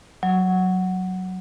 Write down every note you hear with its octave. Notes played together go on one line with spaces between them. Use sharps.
F#3